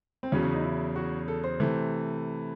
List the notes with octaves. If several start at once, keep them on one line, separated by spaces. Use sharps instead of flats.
C4
E2 C#3 F#3 C#4
C#4
D#4
E4
F#4
A4
C5
C3 E3 A3